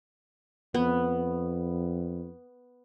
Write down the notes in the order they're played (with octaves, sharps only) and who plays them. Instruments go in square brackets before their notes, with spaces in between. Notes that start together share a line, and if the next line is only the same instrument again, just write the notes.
[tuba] F2 [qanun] B3